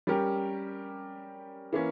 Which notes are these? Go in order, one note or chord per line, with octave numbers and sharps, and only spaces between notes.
G3 C#4 G4 A#4
E3 A#3 C#4